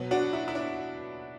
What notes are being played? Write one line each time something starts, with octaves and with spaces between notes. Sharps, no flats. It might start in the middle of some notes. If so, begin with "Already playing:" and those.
Already playing: B2 F#3 B3
D4 F#4
E4
E4
D4